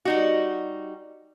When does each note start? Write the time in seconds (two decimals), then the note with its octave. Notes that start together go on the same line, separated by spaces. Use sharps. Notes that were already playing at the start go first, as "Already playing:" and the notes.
0.05 G3 D#4 F#4